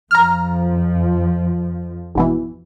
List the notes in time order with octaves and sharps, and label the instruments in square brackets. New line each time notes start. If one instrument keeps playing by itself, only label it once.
[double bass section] F2 F3 [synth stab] A#5 F6
[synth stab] G#1 B2 E3